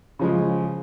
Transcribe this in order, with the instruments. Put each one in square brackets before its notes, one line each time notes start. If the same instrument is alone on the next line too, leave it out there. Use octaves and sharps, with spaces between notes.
[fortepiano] C#3 F3 G#3